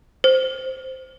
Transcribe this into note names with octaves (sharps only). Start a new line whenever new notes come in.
C5